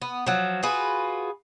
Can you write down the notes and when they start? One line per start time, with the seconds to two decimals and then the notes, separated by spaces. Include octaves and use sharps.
0.01 B3
0.26 F3 F#3
0.63 F4 F#4 G#4 B4